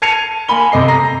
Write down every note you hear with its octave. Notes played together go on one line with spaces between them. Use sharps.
A5 G#6 C7 C#7 D#7 F7
A#3 G#5 B5 G7
C3 A4 D#5 C7
A#5 A#6 C7